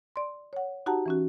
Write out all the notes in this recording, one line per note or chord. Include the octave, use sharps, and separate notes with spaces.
D5 C6
C#5 F#5
D#4 F#4 G4 F#5 A5 A#5
E3 C#4 F#4